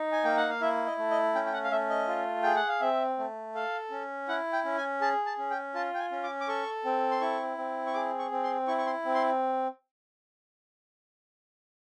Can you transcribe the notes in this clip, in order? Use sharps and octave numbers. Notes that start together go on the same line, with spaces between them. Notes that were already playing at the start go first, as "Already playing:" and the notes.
Already playing: D#4
G#5
A#3 G5
F#5
F5
E4 E5
D#5
A3
D#5
C#4 G5
G5
F#5
F5
A3 E5
D#5
F4
G#4 G5
F#5
F5
C4 E5
A3
A4 F5
C#4
E4 F#5
G5
C#4
G#5
G#4 A5
A5
C#4
G5
F4 A5
G5
G#5
C#4
D6
D6
A4 C#6
C4
C6
E4 C#6
C4
C#6
G#4 D6
C#6
C4
C6
E4 C#6
C#6
C6
C4
C6